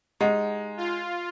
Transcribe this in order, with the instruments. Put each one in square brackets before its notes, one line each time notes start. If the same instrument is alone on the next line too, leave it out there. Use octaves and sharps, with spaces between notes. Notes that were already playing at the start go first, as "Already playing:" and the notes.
[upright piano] G#3 [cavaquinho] D#4 [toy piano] G4 D#5 F#5
[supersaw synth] F4